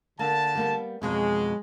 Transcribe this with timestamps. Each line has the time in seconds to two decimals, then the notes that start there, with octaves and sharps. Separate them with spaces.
0.19 D3 A#3 A5
0.55 G3 A#3 B3
1.02 F2 B2 F#3 G#3